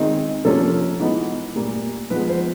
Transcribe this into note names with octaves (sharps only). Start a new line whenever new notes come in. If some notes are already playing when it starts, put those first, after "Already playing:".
Already playing: D#3 G#3 C4 D#4
C3 F3 A#3 C#4 A4
E3 G#3 B3 D#4
A#2 G3 A#3
F3 G#3 B3 B4
C5